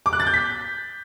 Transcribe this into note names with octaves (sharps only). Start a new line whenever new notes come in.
D6
F#6
A6
G6
B6